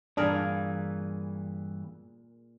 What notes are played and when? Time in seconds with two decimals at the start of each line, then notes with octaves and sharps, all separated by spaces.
0.17 G2 A#2 E3 D4 G#4 A#4